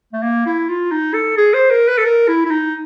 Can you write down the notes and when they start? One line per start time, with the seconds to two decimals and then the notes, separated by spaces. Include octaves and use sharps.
0.13 A3
0.23 A#3
0.46 E4
0.69 F4
0.92 D#4
1.14 A4
1.37 G#4
1.54 C5
1.71 A#4
1.88 B4
1.98 A4
2.05 A#4
2.28 E4
2.46 E4
2.51 D#4